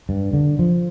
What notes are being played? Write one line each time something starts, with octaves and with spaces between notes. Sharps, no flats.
G2
D3
F3